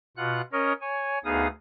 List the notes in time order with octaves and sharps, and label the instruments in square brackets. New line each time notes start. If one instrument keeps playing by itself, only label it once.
[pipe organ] B2 F4 F#5 F#6
C#4 A#4 C#5 D#5
C#5 G#5
D2 B3 D#4 G#4 F5 D#6